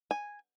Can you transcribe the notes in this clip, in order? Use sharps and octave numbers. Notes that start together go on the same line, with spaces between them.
G#5